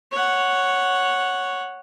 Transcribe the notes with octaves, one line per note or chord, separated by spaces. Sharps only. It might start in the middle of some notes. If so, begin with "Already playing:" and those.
C#5 F#5